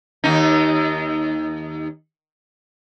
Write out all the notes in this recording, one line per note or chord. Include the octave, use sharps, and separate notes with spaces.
D#2 D#4